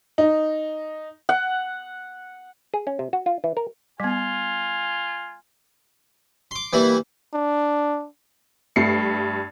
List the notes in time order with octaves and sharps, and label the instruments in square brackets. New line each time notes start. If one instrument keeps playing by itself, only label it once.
[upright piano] D#4
[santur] F#5
[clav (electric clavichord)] G#4
C#4
C3
F#4
F4
E3
A#4
[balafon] G3 B3 [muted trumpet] F4 [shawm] G#5
[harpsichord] C6 D6
[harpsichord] E3 G3 E4 [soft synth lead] A#3
[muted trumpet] D4
[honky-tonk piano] G2 A3 C7 C#7